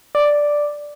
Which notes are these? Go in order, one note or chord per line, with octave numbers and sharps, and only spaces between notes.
D5